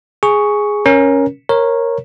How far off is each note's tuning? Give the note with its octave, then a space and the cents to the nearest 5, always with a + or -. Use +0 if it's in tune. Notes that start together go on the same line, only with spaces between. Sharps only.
G#4 +0 C#6 +5
C#4 +0 A#4 +15
A#4 +0 C#5 -15